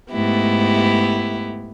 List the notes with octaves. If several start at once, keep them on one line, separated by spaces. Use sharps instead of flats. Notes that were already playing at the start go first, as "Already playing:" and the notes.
G#2 A3 B3 E4 G4